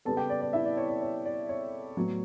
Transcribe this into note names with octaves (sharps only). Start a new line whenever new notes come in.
C#3 G3 B3 A4 A5
G4 G5
D5
D5
E4 E5
D5
C#5
D5
C#5
D5
C#5
A2 F#3 B3